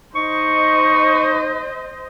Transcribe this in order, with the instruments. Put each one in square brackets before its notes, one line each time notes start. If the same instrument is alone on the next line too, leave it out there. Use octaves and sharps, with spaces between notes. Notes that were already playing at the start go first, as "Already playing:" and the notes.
[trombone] D#4 [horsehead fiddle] C5 D#5 [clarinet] C#6